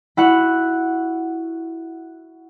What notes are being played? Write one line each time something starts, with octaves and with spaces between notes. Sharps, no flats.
E4 F#4 F#5